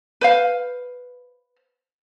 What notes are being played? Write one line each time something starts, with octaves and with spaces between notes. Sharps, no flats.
B4 C5 F5